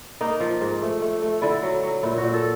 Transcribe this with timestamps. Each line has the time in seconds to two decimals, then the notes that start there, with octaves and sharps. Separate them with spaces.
0.21 A#3 D#4
0.40 F3
0.61 G#2
0.82 A3
1.02 A3
1.22 A3
1.42 D3 E4
1.63 F#3
1.83 F#3
2.03 A#2 E4
2.18 F#4
2.24 A#2
2.33 A4